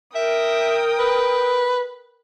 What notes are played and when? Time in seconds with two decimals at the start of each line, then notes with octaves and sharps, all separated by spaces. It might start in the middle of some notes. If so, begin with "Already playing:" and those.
0.15 A#4 E5 G5 D#6
0.99 B4